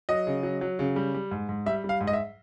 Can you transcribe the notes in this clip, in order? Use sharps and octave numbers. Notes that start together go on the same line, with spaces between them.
F#3 D#5
C#3
F#3
F#3
C#3
G3
G3
G#2
G#2
G3 E5
G3
F5
G#2
D#5
E5